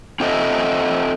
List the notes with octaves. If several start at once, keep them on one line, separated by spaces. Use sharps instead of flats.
C4 F4 A4 D#5 E5